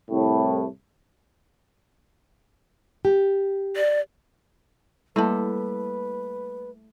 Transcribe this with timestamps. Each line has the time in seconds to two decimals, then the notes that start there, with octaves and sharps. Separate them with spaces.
0.10 C2 A2
3.05 G4
3.76 D5
5.16 G3 A3 A#3 E4 B4 C#5 A5